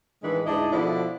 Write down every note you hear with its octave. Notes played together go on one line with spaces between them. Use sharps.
A2 D#3 E3 G#3 D4 B4
D2 G#2 D4 E4 D#5
B2 D3 F3 D4 E4 D5